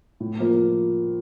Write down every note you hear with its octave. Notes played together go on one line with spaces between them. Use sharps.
A2
F3 A#3 F4 C5